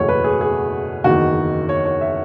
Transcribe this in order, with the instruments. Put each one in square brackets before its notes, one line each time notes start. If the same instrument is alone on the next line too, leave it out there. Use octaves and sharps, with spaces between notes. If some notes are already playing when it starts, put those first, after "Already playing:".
Already playing: [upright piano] F#1 E2 B2 A3 C#5
B4
G#4
G#4
F#1 E2 D#3 F#4
C#5
C#5
E5